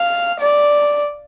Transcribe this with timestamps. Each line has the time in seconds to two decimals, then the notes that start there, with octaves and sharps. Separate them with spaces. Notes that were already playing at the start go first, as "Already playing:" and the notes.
Already playing: F5
0.40 D5